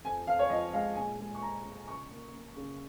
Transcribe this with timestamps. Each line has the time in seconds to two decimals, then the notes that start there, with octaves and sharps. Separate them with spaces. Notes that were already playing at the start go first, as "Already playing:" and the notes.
0.04 F2 G#5
0.27 F2 F5
0.39 C#5
0.50 F3 D#5
0.73 G#3 F5
0.96 A#2 G#5
1.19 G#3
1.35 C#6
1.42 G#3 A#5
1.65 A#2
1.88 C#3 C#6
2.11 A#3
2.34 A#3
2.57 C#3